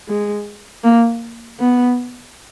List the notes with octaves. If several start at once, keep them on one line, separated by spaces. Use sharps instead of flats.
G#3
A#3
B3